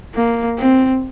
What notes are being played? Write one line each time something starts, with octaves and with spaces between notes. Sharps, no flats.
A#3
C4